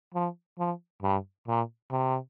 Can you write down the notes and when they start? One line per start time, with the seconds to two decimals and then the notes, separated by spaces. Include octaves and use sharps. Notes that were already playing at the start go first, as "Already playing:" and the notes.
0.14 F3
0.59 F3
1.03 G2
1.48 A#2
1.91 C3